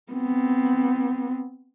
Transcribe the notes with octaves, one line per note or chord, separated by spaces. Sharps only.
B3 C4